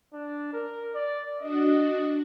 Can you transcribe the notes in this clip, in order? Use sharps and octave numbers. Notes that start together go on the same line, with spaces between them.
D4
A#4
D5
D4 F#4 D#5